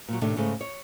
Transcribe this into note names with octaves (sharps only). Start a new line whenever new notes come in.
A#2 F#3
A2 C3 D#3 A3 D4
G#2 C#3 G#3 A3
C#5